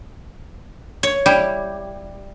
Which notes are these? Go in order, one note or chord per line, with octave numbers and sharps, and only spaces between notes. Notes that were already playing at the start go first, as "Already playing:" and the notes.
C#5
G3 E4 G4